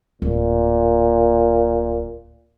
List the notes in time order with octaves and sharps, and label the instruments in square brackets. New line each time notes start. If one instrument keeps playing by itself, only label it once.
[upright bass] D1 [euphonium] A#2